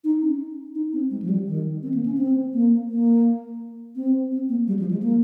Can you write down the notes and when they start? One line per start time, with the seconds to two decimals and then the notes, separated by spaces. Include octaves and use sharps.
0.04 D#4
0.22 C#4
0.75 D#4
0.93 C4
1.10 G#3
1.22 F3
1.29 G3
1.47 D#3
1.83 C4
1.94 A#3
2.06 C#4
2.17 C4
2.53 A#3
2.89 A#3
3.96 C4
4.32 C4
4.49 A#3
4.67 G3
4.79 F3
4.91 G#3
5.03 A#3